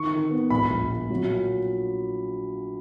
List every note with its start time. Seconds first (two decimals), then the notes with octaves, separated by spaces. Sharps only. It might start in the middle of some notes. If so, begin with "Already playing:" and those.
Already playing: D#3 C#6
0.11 D#3
0.30 B3
0.50 A#1 B5
0.70 A#1
0.91 A#2
1.10 F#3
1.30 A#2